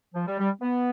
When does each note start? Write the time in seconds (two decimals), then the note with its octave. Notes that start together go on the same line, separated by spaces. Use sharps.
0.15 F3
0.27 G3
0.39 G3
0.61 B3